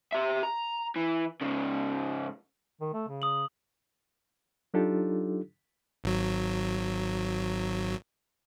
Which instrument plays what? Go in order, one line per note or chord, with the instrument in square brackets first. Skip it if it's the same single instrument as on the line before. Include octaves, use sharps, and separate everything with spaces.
[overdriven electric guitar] G4 E5
A#5
E3
G#2 C#3
[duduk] D#3
A3
C#3
[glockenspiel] D#6 F#7
[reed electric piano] F#3 D4 D#4 F4 G4 A4
[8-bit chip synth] G#1 F#3